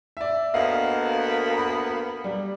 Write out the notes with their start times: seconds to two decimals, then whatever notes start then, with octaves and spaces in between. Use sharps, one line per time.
0.17 D5 E5
0.54 D2 A#3 B3 D#5 F5
1.58 B5
2.24 G3